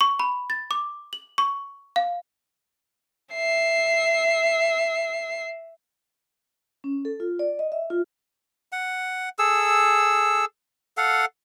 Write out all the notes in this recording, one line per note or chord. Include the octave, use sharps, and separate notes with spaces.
C#6
B5
A6
D6
F#7
C#6
F5
E5 C7
C#4
A4
F4
D5
D#5
E5
F4
F#5
G#4 A4 E6
A4 F5 F#5